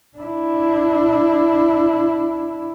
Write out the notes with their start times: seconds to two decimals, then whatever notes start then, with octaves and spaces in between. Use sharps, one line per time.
0.17 D4 E4